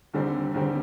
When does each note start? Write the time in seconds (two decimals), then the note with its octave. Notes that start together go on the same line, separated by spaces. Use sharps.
0.14 D#2 D3 G3 C4
0.54 D#2 D3 G3 C4